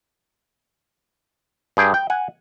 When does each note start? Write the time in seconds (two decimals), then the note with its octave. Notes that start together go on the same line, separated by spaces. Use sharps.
1.77 G2 G#4 G5
1.94 G5
2.10 F#5 G#5